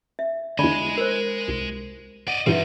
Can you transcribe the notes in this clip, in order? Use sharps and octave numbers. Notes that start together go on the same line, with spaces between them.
E5
E2 D3 G#3 D5 G#5 B5
A#4 C5
C2
D5 D#5 F#5
G2 A#2 E3 C4 D#4 B4 E5